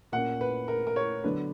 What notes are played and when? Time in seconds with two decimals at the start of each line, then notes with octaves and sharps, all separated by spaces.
0.12 A#2 A#3 C#4 F#5
0.41 B4
0.68 A#4
0.87 A#4
0.96 C#5
1.24 D3 F#3 B3 D4 B4